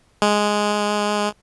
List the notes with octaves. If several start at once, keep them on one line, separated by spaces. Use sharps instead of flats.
G#3